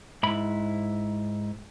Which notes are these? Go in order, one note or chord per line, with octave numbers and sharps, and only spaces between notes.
G#2 E4 B5